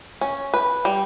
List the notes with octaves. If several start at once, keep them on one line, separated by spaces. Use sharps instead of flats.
C#4
B4
G3